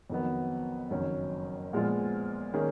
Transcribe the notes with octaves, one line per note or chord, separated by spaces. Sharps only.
F2 D#3 F#3 B3
F#1 F2 D#3 F#3 C#4
A#2 F3 G#3 B3 F4
D#3 A#3 C#4 G#4